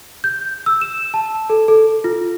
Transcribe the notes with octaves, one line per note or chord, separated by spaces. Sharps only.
G6
E6
E7
A5
A4
A4
F4